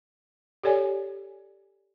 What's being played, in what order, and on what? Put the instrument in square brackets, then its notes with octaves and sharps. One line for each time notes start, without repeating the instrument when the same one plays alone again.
[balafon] G4 A4 C#5 D5 G#5